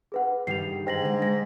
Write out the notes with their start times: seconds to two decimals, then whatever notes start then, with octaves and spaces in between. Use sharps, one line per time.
0.12 G#4 B4 F#5
0.47 G2 D#3 G3 C7 F7
0.87 G#2 G5 A#6 F#7
1.02 D3 G#3
1.22 G#3 A#6